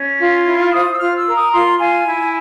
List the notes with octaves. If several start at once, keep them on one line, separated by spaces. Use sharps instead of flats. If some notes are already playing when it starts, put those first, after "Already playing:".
Already playing: C#4
F4
E4
C5 D#6
E6
F4 F6
E6
A#4
D#6
F4 C6
F4 G#5
E4